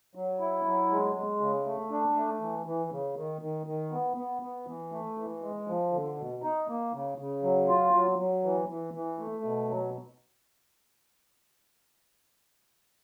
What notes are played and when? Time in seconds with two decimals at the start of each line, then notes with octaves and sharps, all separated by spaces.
0.15 F#3
0.40 E4
0.65 F#3
0.90 G#3
1.16 G#3
1.41 C#3
1.66 A3
1.91 D4
2.16 A3
2.41 E3
2.66 E3
2.91 C#3
3.16 D#3
3.42 D#3
3.67 D#3
3.92 B3
4.17 B3
4.42 B3
4.67 E3
4.92 A3
5.18 E3
5.42 G#3
5.67 F3
5.92 D3
6.18 B2
6.43 D#4
6.68 A#3
6.93 C#3
7.18 C#3
7.43 F#3
7.68 F4
7.93 F#3
8.18 F#3
8.44 E3
8.69 E3
8.94 E3
9.19 A3
9.44 B2
9.69 F#3